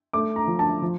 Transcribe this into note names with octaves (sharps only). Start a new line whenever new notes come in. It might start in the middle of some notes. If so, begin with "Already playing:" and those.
A3 D6
A#5
F3
A5
F3